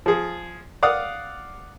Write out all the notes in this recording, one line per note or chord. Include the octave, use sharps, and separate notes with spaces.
F3 G#4
D5 F5 F#5 D#6